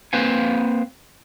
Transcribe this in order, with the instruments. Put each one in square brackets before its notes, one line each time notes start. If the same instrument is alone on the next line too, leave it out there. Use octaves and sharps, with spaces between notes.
[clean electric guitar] A#3 C4 B4 C5 F5 G#5